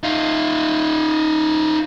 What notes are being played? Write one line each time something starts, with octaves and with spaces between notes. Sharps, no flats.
D#4 F4